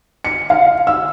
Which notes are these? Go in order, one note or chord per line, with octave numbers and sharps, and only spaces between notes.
C#7
F5
E6